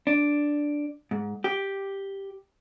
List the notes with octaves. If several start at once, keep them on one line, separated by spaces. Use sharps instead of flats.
D4
G#2
G4